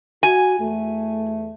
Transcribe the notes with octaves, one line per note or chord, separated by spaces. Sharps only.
F#4 G#5
E2 A3